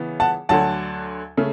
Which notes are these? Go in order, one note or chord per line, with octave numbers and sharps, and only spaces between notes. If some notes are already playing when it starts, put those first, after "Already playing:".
Already playing: C#3 E3 B3
F#5 A5
D2 D3 F#3 F#5 A5
C#3 A3